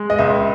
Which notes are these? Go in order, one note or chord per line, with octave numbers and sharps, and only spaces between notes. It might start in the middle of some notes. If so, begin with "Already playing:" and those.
Already playing: G#3
D#5
C#2 E5